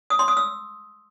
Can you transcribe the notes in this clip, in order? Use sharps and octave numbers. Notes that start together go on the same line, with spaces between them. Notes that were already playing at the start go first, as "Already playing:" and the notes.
D#6
C6
D#6
E6